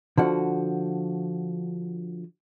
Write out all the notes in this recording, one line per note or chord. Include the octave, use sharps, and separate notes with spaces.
D3 F3 F#4